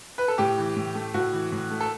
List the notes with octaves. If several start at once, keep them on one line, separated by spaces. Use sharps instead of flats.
B4
A4
A2 G4
E3
A2
A3
A2 F#4
E3
A2
A3
A4